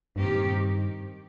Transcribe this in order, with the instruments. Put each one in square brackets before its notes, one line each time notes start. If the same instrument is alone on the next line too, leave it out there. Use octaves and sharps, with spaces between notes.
[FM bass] G2 [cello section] D#3 C4 D#4 G4
[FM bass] A#2
G2